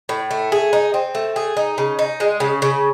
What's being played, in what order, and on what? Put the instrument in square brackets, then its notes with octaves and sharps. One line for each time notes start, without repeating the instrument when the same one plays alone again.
[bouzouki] A2
A3
G#4
D#4
C4
A3
G#4
D#4
C#3
D#4
G#3
C#3
C#3